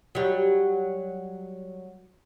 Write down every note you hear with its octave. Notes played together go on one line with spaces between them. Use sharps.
F#3 G3